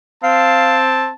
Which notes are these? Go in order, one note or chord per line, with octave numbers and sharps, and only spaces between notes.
C4 F5 A5